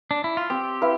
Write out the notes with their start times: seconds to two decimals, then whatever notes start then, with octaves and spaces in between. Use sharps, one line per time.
0.11 D4
0.24 E4
0.37 F4
0.50 C4 G4
0.82 E4 B4 F5